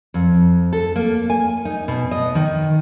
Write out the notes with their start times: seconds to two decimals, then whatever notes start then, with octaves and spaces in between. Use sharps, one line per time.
0.14 F2
0.73 A4
0.96 A#3
1.30 G#5
1.65 D#4
1.88 B2
2.11 D#5
2.35 D#3